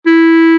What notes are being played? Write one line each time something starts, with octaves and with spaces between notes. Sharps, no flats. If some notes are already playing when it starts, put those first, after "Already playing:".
E4